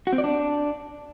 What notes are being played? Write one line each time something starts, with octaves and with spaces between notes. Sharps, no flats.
F#4
C4
D5
D4